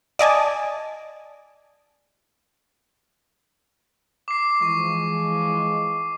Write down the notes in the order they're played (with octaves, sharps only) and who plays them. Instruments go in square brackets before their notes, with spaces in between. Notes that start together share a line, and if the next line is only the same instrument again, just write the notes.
[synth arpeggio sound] D5 D#5 G#5 A5
[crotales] D6 C7
[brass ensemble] E3 F3 G#3 [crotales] C#6